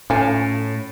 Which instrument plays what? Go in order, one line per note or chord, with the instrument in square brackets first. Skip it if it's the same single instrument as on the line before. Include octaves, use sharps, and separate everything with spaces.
[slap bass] A2 [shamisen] A3 F4 G#5 [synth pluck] C#4